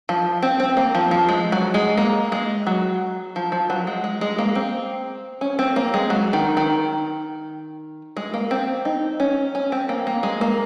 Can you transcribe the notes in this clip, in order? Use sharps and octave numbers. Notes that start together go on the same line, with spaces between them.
F3
C4
C4
A#3
F3
F3
G#3
F#3
G#3
A#3
G#3
F#3
F3
F3
F#3
G#3
G#3
G#3
A#3
C4
C#4
C4
A#3
G#3
F#3
D#3
D#3
G#3
A#3
C4
D#4
C#4
C#4
C4
A#3
A#3
G#3
A#3